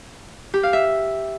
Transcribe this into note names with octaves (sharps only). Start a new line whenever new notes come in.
G4
F5
E5